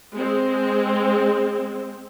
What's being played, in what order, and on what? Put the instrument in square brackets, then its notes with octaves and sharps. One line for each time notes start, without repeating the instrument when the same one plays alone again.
[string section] G#3 C4